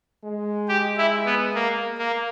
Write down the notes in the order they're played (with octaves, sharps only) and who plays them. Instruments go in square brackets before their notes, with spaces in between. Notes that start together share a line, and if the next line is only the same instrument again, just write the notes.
[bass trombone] G#3
[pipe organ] G4
E4
B3
A#3
A#3